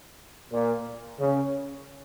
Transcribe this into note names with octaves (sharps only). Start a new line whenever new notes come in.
A#2
C#3